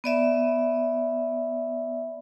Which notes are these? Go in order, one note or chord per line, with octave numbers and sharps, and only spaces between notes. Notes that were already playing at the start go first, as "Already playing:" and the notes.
B3 D5 E5